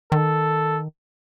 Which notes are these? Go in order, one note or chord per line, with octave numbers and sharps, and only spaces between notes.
D#3 A4